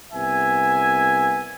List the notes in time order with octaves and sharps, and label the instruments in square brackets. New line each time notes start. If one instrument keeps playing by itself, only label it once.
[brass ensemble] C2 B3 E5 G#5